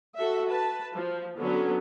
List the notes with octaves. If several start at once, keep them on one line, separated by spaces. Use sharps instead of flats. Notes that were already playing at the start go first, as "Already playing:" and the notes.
F#4 A4 E5
B4 A5
F3
D3 F#3 B3 C#4